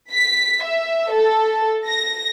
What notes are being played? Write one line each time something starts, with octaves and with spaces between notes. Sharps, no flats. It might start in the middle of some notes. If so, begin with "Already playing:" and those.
B6
E5
A4
A#6